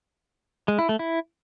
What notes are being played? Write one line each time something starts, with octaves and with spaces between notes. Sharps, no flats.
G#3
E4
A3
E4